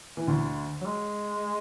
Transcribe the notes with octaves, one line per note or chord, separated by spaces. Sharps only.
E3
D2 D3
F#3
G#3